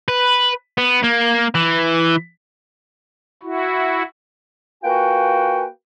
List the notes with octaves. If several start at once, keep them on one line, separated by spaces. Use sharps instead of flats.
B4
B3
A#3
E3
E4 F#4
A#3 F4 F#4 B4 G5 G#5